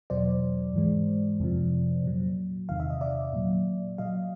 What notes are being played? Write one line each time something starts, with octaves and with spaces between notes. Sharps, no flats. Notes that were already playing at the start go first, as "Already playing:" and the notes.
E2 B2 F#3 C5 D5
G#2 E3 G#3
F2 C3 F3
A#2 F#3
E2 C3 D#3 F5
E5
D#5
D5 E5
A#2 F#3
A#2 F#3 D#5 F5